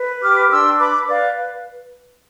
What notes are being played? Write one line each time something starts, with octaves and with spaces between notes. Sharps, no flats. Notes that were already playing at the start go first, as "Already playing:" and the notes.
Already playing: B4
G4 D6 F6
D4 C6 E6
B4 B5 D6
B4 D5 F5